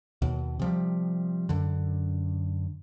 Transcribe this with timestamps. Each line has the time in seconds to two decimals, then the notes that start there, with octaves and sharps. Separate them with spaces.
0.22 D#2 B2
0.59 C3 F3 G3
1.49 F#2 D3